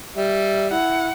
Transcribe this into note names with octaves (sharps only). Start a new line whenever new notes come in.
G3 E5
E4 F#5